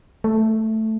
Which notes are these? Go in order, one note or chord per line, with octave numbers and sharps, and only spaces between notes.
A3